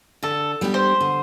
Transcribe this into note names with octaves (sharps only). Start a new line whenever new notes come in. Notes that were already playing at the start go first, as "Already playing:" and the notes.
D3 A4
G3 B3 D4 G4
C5
D3